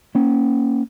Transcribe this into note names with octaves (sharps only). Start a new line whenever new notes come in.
A#3 C#4